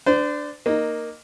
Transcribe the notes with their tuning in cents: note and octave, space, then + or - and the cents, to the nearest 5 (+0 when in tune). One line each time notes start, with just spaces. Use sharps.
D4 +0 C5 -35
A#3 +0 D#4 -10